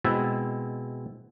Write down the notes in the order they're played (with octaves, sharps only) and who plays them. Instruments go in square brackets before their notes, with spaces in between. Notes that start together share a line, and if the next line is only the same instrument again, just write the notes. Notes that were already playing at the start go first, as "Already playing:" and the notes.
[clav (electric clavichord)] B2 G#3 C4 E4 E5